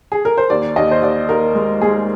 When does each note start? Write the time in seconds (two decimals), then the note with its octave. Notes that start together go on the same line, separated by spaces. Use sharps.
0.12 G#4
0.25 A#4
0.38 C5
0.50 D#2 D5
0.76 D#2 D#5
0.91 C5
1.02 D#2 D5
1.29 D#2 A#4
1.55 G#3
1.81 G#3 G#4